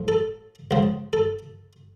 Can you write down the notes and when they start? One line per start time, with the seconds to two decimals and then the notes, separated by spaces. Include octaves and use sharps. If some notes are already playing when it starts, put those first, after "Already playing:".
Already playing: A2 F3
0.08 A4
0.71 C#2 C#3 F3
1.13 A4